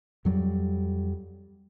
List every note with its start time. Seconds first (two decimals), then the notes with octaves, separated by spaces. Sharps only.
0.25 F2 F#3 G3